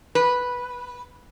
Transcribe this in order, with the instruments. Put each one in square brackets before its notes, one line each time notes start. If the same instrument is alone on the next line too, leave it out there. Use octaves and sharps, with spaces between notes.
[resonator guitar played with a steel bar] B4